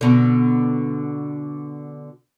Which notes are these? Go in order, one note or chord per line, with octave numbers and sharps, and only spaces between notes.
B2 D3